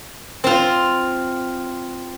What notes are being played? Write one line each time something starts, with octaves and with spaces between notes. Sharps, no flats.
C4 F4